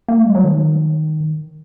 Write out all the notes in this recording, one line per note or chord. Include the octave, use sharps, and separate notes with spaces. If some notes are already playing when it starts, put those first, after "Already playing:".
A#3
A3
G3
F#3
D#3